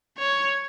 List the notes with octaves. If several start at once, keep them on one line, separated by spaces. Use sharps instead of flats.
C#5